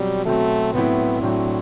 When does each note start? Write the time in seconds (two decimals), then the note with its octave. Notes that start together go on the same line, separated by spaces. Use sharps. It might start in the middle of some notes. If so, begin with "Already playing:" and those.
Already playing: B2 F#3 G3 C4
0.25 B2 F#3 A3 C4
0.73 A2 F#3 B3 C4 E4
1.22 A2 F#3 C4 D4 E4